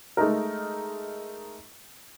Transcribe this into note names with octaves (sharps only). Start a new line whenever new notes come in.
G#3 A3 D#4 A#4